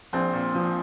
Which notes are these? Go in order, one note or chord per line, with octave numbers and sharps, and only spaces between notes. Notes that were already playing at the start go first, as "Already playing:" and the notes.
A#1 C4
A#2
F3